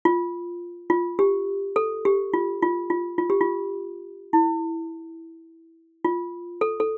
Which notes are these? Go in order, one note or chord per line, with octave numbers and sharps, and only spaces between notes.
F4
F4
G4
A4
G4
F4
F4
F4
F4
G4
F4
E4
F4
A4
A4